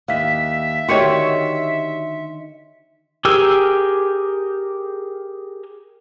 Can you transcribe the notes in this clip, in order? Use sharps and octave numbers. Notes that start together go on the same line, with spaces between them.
D#2 E5 F5 B6
D3 D#3 A3 F#4 G4 C#5 C6 C#7
G4 G#4 A#4 E6